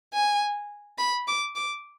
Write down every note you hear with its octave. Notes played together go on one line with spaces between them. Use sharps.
G#5
B5
D6
D6